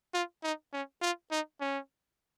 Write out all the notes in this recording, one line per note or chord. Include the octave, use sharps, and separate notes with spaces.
F4
D#4
C#4
F4
D#4
C#4